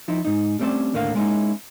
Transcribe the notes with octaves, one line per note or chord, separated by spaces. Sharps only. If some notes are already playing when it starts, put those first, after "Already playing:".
F3 D#4 E4
G#2 D#4
G3 A3 C4 C#4 C5 D5
D#2 A2 D3 A#3 B4 F5
G#3 A#3 C#4 D#4 E4